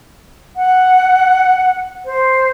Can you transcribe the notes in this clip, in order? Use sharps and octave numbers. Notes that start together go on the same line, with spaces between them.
F#5
C5